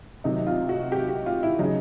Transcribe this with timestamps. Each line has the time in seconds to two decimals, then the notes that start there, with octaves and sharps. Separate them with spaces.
0.24 C3 D#3 F#3 D#4
0.47 F4
0.69 F#4
0.92 G4
1.09 G4
1.26 F4
1.43 E4
1.59 C#3 F#3 D#4